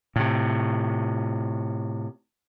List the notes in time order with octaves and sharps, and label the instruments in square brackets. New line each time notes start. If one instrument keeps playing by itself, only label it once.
[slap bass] A2 C3